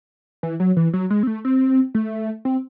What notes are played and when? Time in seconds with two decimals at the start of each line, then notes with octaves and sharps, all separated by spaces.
0.43 E3
0.60 F#3
0.77 E3
0.93 F#3
1.10 G#3
1.23 C4
1.27 A3
1.45 C4
1.95 A3
2.45 C4